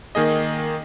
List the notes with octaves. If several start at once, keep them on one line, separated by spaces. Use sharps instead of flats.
D#3 A#3 G#4 D#5